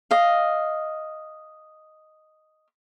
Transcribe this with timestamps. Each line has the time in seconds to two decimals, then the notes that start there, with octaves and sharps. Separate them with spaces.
0.11 D#5 F5